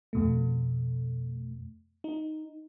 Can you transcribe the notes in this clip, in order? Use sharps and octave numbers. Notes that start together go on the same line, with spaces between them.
F2 B2 A3
D#4